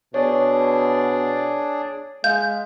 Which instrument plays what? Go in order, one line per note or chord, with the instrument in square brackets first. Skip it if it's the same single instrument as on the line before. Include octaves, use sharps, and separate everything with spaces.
[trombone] B2 [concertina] D4 G#4 D5 [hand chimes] C#5
[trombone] G#3 [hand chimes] F5 [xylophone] G6